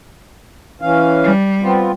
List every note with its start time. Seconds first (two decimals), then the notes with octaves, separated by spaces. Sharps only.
0.82 E3 C#4 F5
1.24 G3
1.62 B3 C4 F4